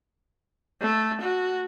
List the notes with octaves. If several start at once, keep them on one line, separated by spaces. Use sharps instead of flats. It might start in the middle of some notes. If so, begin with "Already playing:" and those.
A3
F#4